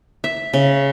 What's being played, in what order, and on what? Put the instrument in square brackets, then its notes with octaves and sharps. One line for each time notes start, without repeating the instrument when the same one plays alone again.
[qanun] E5
C#3